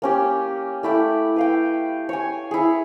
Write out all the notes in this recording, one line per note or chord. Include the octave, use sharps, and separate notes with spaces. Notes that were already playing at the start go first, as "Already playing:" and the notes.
A#3 C#4 G4
A3 E4 D5 G5
B4 F5 G5
C#5 G#5
E4 G#4